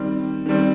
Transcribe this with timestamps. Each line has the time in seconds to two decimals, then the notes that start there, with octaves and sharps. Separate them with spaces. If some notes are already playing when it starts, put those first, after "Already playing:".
Already playing: D#3 G3 C4
0.46 D#3 G3 C4